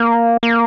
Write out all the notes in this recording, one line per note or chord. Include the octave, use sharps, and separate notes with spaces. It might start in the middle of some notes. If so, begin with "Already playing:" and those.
Already playing: A#3
A#3